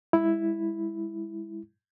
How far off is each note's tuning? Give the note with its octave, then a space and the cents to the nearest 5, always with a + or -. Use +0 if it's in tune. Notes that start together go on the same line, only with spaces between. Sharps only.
G#3 -35 E4 +0